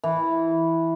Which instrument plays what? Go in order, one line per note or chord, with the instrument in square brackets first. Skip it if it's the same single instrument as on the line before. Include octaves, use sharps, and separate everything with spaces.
[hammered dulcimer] E3